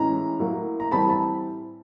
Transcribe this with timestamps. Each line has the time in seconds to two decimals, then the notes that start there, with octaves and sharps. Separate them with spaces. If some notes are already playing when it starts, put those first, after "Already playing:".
Already playing: A2 E3 G#3 C#4 A#5
0.39 A2 F#3 A#3
0.80 A#5
0.91 A2 E3 G3 C4 A5 B5
1.09 A5 B5